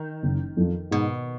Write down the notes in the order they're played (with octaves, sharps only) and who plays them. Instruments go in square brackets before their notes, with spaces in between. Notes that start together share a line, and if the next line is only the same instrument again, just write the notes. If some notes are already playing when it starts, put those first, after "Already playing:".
Already playing: [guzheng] D#3
[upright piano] F#1
F2 F3
[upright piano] G#2 [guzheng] B2